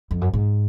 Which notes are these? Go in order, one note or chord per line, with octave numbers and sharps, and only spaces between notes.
F2
F#2
G#2